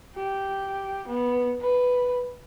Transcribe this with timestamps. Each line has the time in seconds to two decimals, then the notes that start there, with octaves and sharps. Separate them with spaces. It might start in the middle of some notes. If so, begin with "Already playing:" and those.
0.16 G4
1.08 B3
1.61 B4